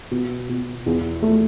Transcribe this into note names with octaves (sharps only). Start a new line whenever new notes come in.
B2
B2
E2
A3